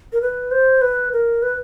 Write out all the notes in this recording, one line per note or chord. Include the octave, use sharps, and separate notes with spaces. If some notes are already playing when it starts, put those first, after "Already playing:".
A#4
B4
C5
B4
A#4
B4